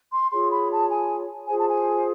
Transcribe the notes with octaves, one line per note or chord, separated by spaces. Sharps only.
C6
F4 G#4 C#5 C6
B5
A5
G#5
F4 G#4 C5 G#5
A5
G#5